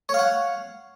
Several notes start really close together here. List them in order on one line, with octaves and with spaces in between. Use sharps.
C#5 F5 F#5